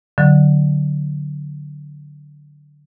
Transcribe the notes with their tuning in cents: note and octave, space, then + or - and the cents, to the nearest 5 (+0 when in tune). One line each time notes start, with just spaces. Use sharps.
D3 +0 F#3 +0